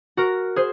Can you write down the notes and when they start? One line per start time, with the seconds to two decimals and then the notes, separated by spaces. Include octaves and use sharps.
0.17 F#4 A#4
0.56 G#4 C5